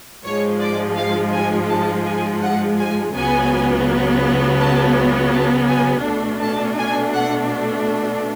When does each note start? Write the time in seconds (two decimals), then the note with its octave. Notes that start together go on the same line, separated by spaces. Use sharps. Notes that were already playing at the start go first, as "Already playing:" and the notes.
0.24 G#2 F3 G#3 C#5
0.60 D5
0.97 F5
1.33 G#5
1.69 A5
2.05 G#5
2.42 F#5
2.78 G#5
3.15 C#2 C#3 F#3 B3 G#5
4.60 A5
5.33 A5
5.69 G#5
6.05 B2 A3 D4
6.41 A5
6.78 G#5
7.15 F#5